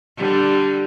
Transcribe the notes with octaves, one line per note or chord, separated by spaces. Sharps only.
D3 G3